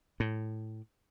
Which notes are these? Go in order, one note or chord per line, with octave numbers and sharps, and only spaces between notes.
A2